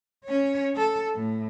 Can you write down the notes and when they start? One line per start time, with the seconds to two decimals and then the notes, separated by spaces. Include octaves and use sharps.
0.25 C#4 C#5
0.76 A4
1.15 A2